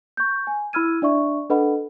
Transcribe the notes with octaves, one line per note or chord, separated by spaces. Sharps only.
C#6 G6
G#5
E4 B5 E6 F6 G#6 D#7
D4 D5 E5 C#6
D4 A4 B4 D#5 F#5 B5